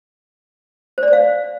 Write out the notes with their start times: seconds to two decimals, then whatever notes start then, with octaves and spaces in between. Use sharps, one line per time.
0.98 C5
1.03 D5
1.08 C5
1.13 F5